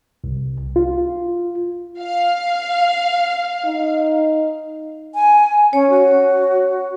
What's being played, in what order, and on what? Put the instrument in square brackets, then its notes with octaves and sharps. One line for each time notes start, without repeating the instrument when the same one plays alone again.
[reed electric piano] C2
F4
[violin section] F5
[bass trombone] D#4
[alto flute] G#5
[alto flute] C#4 [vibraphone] C#5
[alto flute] F#4